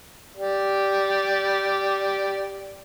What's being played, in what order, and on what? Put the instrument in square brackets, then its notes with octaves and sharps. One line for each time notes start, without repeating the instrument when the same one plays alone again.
[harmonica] G4 D5